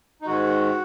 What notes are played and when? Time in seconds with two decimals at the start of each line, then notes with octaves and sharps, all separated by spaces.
0.22 D#4
0.26 G#2 D#3 G#3 F#4